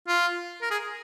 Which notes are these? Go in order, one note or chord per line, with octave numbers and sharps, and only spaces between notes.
F4
A#4
G#4